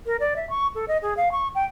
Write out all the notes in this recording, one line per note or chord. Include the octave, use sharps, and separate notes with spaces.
A#4
D5
E5
C#6
A4
D#5
G#4
F5
C#6
G5